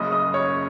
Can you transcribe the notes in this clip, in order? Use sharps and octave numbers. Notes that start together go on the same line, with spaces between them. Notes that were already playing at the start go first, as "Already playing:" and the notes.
Already playing: F#1 F#2 C#3 D#5 D#6
D#5 D#6
C#5 C#6